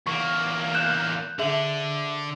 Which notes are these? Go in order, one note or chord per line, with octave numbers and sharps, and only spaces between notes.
E2 A#3 C#6
F#6 G6 E7
D3 G#4 E5 F#7